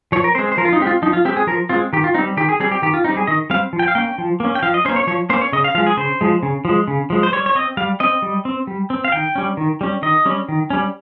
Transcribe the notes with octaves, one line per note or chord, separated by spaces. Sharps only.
F3 C#5
A#4
G#3 C4 C5
C5
F3 A#4
F4
D#4
G#3 C4 G4
F4
F3 D#4
F4
G#3 C4 G4
G#4
F3 A#4
G#3 C4 F4
D#3 G4
F4
G3 C4 D#4
D#3 G4
G#4
G3 C4 G#4
G4
D#3 G4
F4
G3 C4 D#4
G#4
D#3 D#5
G3 C4 F5
F3
G5
F5
A#3 C#4 G5
F3
A#3 C#4
G5
F3 F5
D#5
A#3 C#4 C5
C#5
F3 C#5
A#3 C#4 C5
C#5
C#3 D#5
F5
F3 G#3 F5
G#4
C#3 C5
F3 G#3
C#3
F3 G#3
C#3
F3 G#3
C5
G3 C#5
C#5
C4 D#5
G3 F5
C4 D#5
G3
C4
G3
C4
F5
D#3 G5
G3 C#4
D#3
G3 C#4
D#3 D#5
G3 C#4
D#3
G3 C#4